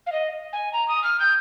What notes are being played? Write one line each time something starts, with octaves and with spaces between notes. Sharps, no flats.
F5
D#5
G#5
A#5
D#6
F6
G6